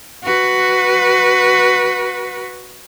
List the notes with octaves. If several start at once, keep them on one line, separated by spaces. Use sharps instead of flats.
F#4 B4